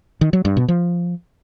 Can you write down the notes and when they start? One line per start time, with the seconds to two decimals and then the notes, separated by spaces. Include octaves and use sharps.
0.21 D#3
0.33 F#3
0.45 G2
0.57 B2
0.68 F3